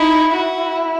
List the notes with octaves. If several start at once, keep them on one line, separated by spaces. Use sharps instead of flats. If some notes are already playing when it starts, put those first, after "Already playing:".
Already playing: D#4 E4
E4 F#4